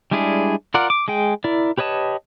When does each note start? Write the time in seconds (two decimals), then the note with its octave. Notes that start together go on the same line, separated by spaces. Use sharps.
0.11 G3 G#3 D4 E4 G#4
0.74 F4 A#4 D5 F#5
0.90 D6
1.08 G#3 G#4 G5
1.44 E4 A#4 D5
1.78 G4 B4 C#5 D#5 A5